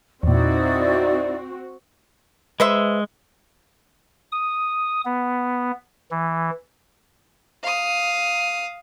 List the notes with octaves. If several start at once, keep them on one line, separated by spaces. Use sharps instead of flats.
E2 A#2 C4 D#4 E4 F#4 D5
G#3 B4 C5 E5
D#6
B3
E3
F5 D#6